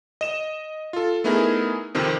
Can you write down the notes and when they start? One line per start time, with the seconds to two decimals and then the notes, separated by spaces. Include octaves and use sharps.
0.21 D#5 E7
0.93 F4 A4
1.24 A3 B3 D#4 E4 G#4 A#4
1.95 F2 C3 D#3 C4